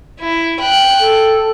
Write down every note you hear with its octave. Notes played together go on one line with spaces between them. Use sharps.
E4
G5 F#6
A4